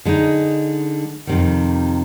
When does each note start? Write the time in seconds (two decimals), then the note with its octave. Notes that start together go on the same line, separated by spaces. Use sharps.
0.05 D3 G#3 D#4
1.27 F2 C3 D#3